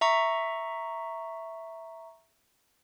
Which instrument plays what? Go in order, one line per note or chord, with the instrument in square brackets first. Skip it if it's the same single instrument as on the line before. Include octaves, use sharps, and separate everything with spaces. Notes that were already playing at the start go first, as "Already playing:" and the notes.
[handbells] E5 A#5 C#6